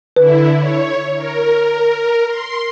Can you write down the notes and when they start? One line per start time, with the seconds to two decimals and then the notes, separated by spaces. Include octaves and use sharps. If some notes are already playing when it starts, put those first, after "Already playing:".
0.16 D3 E4 B4
0.57 C#5
1.16 A#4
2.27 C6